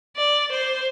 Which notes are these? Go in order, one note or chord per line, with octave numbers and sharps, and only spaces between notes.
D5
C5